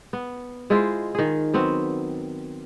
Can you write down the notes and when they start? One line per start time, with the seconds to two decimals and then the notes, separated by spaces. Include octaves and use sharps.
0.13 B3
0.70 G#3 E4 F4 C5
1.15 D#3 G#4
1.54 F#3 B3 C4